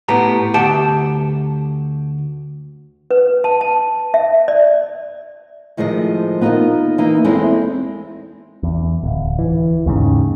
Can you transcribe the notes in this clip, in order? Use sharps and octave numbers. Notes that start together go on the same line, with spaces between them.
A2 B3 G4 A#5
D2 G4 F#5 A5
B4
A5
A5
E5
D5
A2 D#3 F3 G#3 C5 D#5
B3 D#4 F4 A4 A#4 D#5
E3 A#3 D#4
E2 G#3 C4 E4 A4
E2
D1
E3
D#2 G#2 C#3